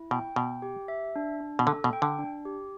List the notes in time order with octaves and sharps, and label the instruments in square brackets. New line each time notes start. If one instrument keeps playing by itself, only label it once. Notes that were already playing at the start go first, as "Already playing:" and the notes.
Already playing: [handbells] E4
[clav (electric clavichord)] B2 [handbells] G5
[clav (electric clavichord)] B2 [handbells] G5
[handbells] G4
E5
D4
D4
[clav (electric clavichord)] B2
[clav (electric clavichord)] D3 [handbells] A4
[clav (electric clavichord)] B2
[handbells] G5
[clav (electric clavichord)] D3
[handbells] D4
G4